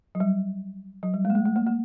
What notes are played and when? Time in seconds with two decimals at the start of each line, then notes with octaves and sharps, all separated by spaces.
0.15 F#3
0.20 G3
1.03 F#3
1.14 G3
1.25 G#3
1.30 A#3
1.35 A3
1.45 A3
1.56 A#3
1.67 A#3